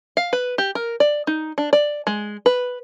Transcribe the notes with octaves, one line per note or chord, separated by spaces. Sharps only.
F5
B4
G4
A#4
D5
D#4
D4
D5
G#3
B4